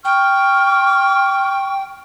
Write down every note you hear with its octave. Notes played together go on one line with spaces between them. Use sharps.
G5 C#6 F6